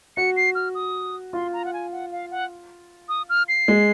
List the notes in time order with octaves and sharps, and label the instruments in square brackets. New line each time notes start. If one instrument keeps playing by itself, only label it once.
[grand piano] F#4 [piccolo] C#7
[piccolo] C7
F6
D#6
[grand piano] F4 [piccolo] C6
[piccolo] A#5
F#5
G#5
F#5
F5
F#5
D#6
F6
C7
[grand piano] G#3